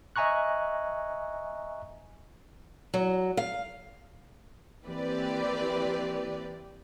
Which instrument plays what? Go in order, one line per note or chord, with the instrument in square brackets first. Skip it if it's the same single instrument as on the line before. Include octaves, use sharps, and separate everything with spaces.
[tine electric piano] D#5 E5 G#5 A#5 C#6 F#6
[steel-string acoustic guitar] F#3
F5
[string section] E3 A#3 C4 G4 B4 D5